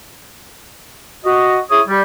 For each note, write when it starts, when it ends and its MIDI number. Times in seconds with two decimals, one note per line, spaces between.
1.25 1.58 66
1.25 1.58 75
1.70 1.81 64
1.70 1.81 68
1.70 1.81 73
1.70 1.81 87
1.88 2.03 55